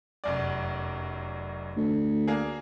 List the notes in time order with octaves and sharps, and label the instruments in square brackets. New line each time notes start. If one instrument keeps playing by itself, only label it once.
[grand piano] F1 F#2 D5
[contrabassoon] D2
[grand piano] A#3 D4 G#4